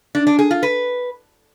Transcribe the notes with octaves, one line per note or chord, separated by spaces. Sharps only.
D4
D4
G#4
F4
B4